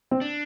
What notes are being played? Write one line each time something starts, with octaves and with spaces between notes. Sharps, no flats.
C4
D4